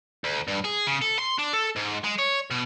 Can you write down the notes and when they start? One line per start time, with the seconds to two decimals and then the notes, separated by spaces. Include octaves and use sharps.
0.24 D2
0.48 G2
0.65 G#4
0.87 C#3
1.01 A4
1.19 C6
1.38 D4
1.53 A4
1.76 G#2
2.04 G#3
2.19 C#5
2.51 B2